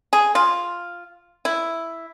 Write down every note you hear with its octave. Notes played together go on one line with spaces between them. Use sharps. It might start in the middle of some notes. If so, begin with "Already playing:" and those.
G#4
F4
E4